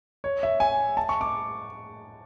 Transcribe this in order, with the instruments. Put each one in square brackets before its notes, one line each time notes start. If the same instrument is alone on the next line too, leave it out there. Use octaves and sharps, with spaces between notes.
[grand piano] C#5
E5
G#5
A5
C#6
D6